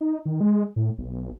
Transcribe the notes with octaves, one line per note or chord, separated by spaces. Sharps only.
D#4
D#3
G#3
A2
B1